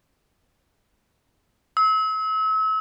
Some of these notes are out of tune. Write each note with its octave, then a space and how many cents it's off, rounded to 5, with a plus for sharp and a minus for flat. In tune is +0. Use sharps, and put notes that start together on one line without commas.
E6 -35